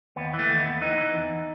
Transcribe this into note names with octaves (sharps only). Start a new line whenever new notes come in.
D#2 B3
E3
A3
D#2
B3
D#2
E3 D#4
E3
E2